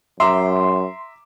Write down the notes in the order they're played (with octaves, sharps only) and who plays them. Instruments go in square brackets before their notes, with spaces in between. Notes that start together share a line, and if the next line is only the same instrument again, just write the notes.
[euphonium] F#2 [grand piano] E5 A#5 D6 [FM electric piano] C6